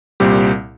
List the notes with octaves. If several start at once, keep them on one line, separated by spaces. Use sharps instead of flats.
C2 A#2 G3 C4 G4